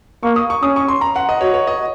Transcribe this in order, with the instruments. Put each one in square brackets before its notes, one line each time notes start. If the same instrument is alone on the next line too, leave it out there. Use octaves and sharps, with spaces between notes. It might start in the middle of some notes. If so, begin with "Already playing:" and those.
[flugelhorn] A#3 [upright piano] C#6
[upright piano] D#6
C#6
[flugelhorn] C#4 [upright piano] D#6
[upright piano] C#6
C6
A#5
F#5
D#5
[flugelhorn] F#4 [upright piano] C#5
[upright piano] C#5
D#5